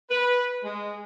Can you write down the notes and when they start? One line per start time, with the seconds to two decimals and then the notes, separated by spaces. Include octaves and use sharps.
0.10 B4
0.64 G#3